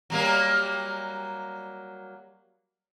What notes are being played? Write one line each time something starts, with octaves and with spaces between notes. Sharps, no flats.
F#3 G3 A#3